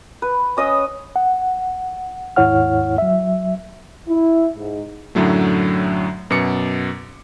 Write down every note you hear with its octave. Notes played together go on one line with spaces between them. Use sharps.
B4
C#4 D#5 D#6 E6
F#5
D#2 G#2 E4 C#5 F#5 F6
F#3 E5
E4
G#2
F#2 A2 D3 F#3 A3
F#2 B2 D6 C#7